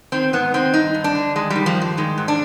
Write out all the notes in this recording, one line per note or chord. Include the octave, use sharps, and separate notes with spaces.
D#3 C4
G#2 B3
D#3 C4
G2 D#4
G2
D4
D3
D#3 G#3
G3
D#3
F3
G2 F3
D#3 G#3
G#2
D4